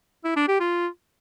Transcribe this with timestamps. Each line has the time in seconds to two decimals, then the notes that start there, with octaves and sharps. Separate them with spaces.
0.24 E4
0.36 D4
0.48 G4
0.60 F4